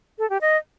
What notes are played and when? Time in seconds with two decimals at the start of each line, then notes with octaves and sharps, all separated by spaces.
0.19 A4
0.30 G4
0.41 D#5